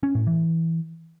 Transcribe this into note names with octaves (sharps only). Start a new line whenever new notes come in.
C#4
A2
E3